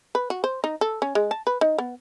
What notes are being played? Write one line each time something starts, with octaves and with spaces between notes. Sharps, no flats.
B4
F#4
C5
D#4
A4
C#4
G#3
A5
B4
D#4
B3